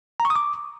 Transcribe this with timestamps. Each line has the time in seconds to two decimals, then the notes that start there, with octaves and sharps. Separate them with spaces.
0.20 A#5
0.25 C#6
0.30 D#6
0.36 D6